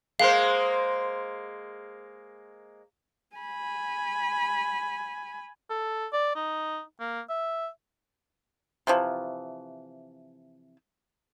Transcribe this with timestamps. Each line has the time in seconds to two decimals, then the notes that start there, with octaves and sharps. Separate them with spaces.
0.19 G#3 A#3 C5 F5
3.37 G#5 B5
5.70 A4
6.13 D5
6.35 D#4
7.00 A#3
7.29 E5
8.87 C3 E3 F3